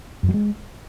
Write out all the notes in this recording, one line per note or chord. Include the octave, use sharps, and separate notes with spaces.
F#2
F#3
G#3